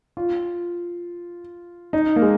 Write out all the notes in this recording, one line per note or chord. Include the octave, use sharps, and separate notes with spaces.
F4
D#4
A#3
G#3